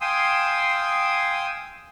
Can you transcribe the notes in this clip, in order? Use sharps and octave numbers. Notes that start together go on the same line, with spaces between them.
F5 G5 G#5 C6 D#6 E6